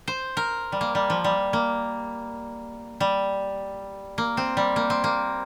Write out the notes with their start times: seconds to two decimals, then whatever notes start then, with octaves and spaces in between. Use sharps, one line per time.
0.08 C5
0.37 A#4
0.72 G3
0.81 A#3
0.95 G3
1.10 F3
1.24 G3
1.53 A#3
3.00 G3
4.18 A#3
4.37 C4
4.57 G3
4.76 A#3
4.90 C4
5.04 A#3